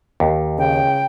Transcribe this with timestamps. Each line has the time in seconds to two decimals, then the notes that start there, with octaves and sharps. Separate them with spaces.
0.20 D#2
0.58 C#3 G5